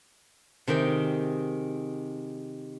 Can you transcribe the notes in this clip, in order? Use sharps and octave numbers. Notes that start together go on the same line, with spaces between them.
C3 D#3 G#4 G5